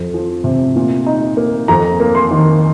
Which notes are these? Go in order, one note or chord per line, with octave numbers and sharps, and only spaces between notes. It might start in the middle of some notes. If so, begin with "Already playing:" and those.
Already playing: F2
F3
C3
A#2
D#4
A#3
F2 A#5
A#3
C6
D#3